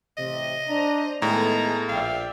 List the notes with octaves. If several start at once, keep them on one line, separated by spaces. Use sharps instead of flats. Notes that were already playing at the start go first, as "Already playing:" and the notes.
A1 C3 D#5
D4 C5 A#5
A2 D#3 G#3 B3 G#4 A4 A#5
A#1 D5 E5 F5 G5